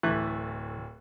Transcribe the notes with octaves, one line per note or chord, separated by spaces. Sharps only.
D1 E3 A3 B4 F#6